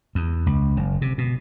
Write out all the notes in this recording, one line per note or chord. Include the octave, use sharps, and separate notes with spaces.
E2
C#2
F#1
C3
B2